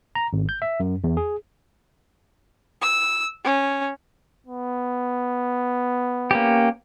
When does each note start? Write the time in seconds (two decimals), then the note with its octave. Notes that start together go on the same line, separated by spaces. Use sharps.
0.15 A#5
0.33 G#1
0.49 G6
0.62 E5
0.80 F#2
1.04 E2
1.17 G#4
2.81 E6
3.44 C#4
4.46 B3
6.31 A#3 C#4 G4